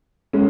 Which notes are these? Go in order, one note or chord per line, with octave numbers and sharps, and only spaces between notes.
G#3 C#4